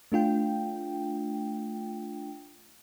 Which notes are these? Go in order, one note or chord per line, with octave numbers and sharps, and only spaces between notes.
A3 D4 F4 G5